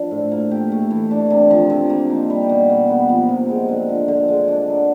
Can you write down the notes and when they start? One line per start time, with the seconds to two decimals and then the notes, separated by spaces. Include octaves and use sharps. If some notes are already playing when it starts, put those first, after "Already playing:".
Already playing: F3 D4
0.11 A2
0.32 A#3
0.51 G4
0.72 A3
0.91 E3
1.11 D4
1.30 C3
1.51 F3
1.70 C3
1.90 A#3
2.10 D#4
2.30 G3
2.49 B2
2.70 A#3
2.89 B3
3.09 F3
3.29 C3
3.49 G#3
3.68 D3
3.89 F3
4.08 D3
4.28 G#3
4.48 D4
4.68 F#3